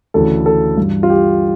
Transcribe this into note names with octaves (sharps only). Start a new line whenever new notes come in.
D2 C#3 E3 A4
A4
G2 E3
F4
G4